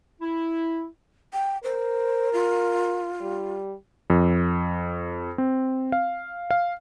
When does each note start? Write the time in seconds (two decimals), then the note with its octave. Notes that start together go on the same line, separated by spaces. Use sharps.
0.21 E4
1.33 G5
1.64 A#4 C5
2.33 F4
3.21 G3
4.10 F2
5.38 C4
5.92 F5
6.51 F5